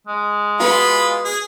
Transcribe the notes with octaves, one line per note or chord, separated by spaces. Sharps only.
G#3
B3 F4 F#4 B5
G#4